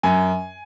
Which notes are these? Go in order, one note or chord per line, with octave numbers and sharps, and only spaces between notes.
F#2 G#5